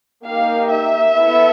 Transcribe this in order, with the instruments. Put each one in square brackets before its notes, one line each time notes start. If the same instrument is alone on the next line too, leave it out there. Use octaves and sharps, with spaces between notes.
[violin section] A#3 D#4 G4 F5
E5
B3 E4 A4